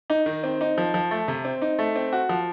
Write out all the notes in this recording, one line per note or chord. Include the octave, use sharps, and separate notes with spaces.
D#4
D#3
C4
D#4
F3
F3
A3
C3
C4
D#4
A3
C4
F#4
F3